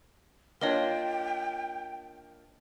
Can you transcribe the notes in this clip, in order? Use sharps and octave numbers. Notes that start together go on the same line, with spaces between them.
A#3 D4 F4 C#5 D#5 G5 G7